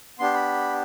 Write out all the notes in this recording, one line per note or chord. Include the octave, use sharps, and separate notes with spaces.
B3 D4 G4 C6
B5